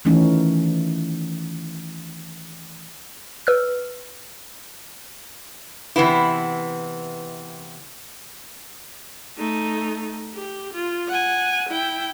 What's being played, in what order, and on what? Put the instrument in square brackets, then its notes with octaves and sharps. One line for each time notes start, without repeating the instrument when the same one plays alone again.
[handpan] D#3 E3 A3 C#4 D#4
[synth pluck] B4 E6 F6
[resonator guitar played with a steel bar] C3 E3 B3 E4
[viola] A3 D#4
G4
F4
F#5 G#5
E4 G5